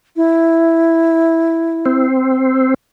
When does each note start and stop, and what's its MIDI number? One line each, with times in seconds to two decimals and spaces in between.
0.16 2.06 64
1.86 2.74 60